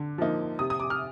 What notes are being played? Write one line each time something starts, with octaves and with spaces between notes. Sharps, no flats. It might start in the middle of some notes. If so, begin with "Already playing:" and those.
Already playing: D3
F3 A#3 D#4
C3 D#6
D#6
D6
F6